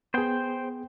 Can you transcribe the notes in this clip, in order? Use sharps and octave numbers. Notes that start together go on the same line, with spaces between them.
B3 G#4 C5 G5